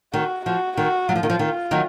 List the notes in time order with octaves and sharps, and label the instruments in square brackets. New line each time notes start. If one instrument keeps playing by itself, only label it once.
[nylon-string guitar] D#3 [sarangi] F#4
[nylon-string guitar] F3 [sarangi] F#4
[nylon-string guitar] D#3 [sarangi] F#4
[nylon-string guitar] F#3 [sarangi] F4
[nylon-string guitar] F3
D#3
F3
D#3
D#3 F#3